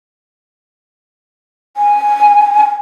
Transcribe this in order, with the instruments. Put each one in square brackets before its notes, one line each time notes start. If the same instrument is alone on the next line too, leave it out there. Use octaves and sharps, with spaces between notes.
[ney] G#5